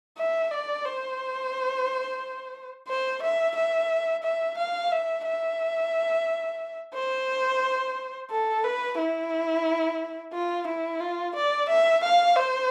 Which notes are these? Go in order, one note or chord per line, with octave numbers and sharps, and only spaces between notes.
E5
D5
C5
C5
E5
E5
E5
F5
E5
E5
C5
A4
B4
E4
F4
E4
F4
D5
E5
F5
C5